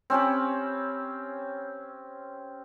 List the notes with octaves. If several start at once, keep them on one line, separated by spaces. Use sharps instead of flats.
C4 C#4 G4 B5